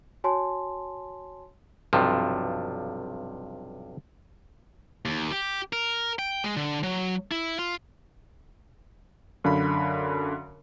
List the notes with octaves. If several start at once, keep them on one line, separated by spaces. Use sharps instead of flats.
F#4 C#5 G#5 A5 C6
B1 G2 C3 F3
D#2
G4
A#4
G5
G#3
D3
F#3
E4
F4
F#2 D3 F5 B5